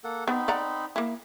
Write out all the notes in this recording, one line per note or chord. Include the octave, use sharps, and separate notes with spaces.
A#3 A4 F#5
B3 C4 D#4 B5
D5 F#5 A#5
A#3 E4